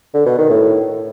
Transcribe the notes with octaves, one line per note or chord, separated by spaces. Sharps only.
D3
B2
D#3
A2